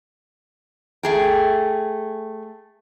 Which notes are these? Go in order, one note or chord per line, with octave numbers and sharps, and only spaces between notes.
A3 G#4 G5